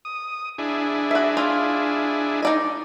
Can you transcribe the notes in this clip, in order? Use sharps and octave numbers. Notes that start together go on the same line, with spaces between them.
D#6
D4 E4 G#4
F#4 E5
F4
D#4 D5 D#5